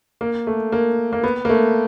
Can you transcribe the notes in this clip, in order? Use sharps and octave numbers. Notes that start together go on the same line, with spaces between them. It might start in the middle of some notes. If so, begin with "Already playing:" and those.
A#3
A3
A#3
A#3
B3
A#3
A3